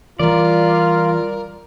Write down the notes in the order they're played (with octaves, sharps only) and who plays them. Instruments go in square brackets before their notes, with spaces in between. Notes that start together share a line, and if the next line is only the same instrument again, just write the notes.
[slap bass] E3 G3 [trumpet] F4 [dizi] A#4 [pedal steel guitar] D5